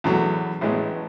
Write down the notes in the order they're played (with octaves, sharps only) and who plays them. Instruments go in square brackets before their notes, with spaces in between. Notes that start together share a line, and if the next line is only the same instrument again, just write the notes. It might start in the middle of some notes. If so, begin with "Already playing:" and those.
[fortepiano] E2 B2 F#3 A3
A1 A2 G#3 B3